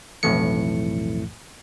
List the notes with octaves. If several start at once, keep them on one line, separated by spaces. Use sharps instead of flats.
B1 F2 A2 E3 A3 C#7